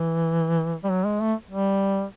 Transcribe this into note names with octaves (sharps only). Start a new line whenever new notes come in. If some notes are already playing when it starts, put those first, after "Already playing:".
Already playing: E3
G3
F#3
G#3
A3
G3